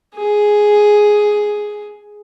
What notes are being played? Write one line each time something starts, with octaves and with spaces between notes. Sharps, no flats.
G#4